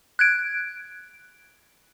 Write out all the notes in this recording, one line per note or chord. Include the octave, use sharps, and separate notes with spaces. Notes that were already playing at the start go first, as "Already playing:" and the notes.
F#6 G#6 D7